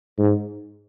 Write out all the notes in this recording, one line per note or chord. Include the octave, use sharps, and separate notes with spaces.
G#2